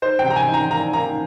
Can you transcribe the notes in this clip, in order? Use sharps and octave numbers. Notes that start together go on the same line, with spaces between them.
D#4 C5
G5
C3
A#5
G#5
D#4
A#5
A#3 A#5
A#3 A#5